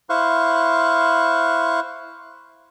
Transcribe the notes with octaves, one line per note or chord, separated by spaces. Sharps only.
E4 C5 F5 C#6 F#6